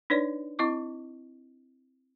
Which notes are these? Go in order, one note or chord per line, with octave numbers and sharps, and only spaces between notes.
D4 D#4 B4 C#5 D5
C4 E4 D#5 C#6 D6